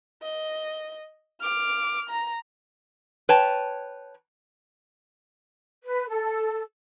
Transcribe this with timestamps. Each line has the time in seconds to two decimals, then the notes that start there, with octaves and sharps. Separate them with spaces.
0.22 D#5
1.40 D6 F6
2.10 A#5
3.29 B4 C#5 G5 A5
5.84 B4
6.08 A4